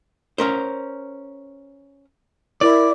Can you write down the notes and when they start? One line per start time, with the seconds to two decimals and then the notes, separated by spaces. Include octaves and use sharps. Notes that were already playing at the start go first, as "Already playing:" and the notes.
0.38 C#4 A#4 C5
2.61 E4 A#4 D5